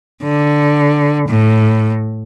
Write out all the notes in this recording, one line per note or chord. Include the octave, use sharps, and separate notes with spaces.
D3
A2